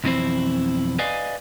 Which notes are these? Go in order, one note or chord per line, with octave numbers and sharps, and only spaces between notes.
B1 F2 E3 C4 E4 C5
B4 D5 D#5 F5 G#5